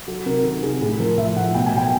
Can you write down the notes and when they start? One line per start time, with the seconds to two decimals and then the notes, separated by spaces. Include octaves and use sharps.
0.08 F#3 A4
0.26 C3 A#4
0.44 D#3 A4
0.63 C3 G#4
0.81 A2 G#4
0.99 F3 A#4
1.18 F3 E5
1.36 A2 F#5
1.55 B2 G5
1.66 G#5
1.73 F#3 G5